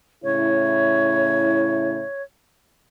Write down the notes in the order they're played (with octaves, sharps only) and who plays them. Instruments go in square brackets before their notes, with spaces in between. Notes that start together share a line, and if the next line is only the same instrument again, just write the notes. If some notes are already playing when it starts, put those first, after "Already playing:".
[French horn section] A2 C#3 E4 [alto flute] C#5